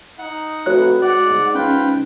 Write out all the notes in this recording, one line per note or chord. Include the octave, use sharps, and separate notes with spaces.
D#4 F#5
F2 A3 F#4 B4 C#5 F#6
G#2 D5 F#5
C#4 F4 B4 G5